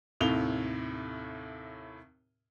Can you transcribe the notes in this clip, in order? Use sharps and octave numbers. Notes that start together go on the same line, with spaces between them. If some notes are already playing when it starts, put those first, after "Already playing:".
D#2 A2 C3 F7 G7